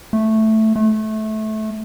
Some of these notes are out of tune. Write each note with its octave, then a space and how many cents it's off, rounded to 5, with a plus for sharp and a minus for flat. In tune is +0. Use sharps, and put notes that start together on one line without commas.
A3 +0
A3 -20